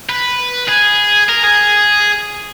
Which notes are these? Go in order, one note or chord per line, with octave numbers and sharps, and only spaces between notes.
B4
G#4
A#4
G#4